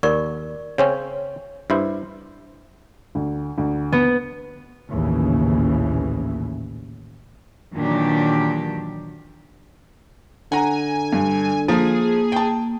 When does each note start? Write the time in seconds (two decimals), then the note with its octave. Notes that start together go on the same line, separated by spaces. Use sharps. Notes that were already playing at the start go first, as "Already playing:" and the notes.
0.03 D#2 A#4 D5 C#6
0.78 C#3 C4 C#4 C#5
1.70 G2 E4 C5
3.15 D2
3.58 D2
3.92 B3
4.91 A#1 D#2 A2 C#3 E3
7.75 A#2 D#3 E3 F#3 D4 G4
10.52 D3 F#5 G#5 A#5
11.13 G2
11.68 F3 A#3 G#4
12.32 G5 A5